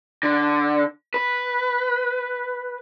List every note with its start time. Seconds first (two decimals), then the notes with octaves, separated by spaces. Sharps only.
0.23 D3
1.14 B4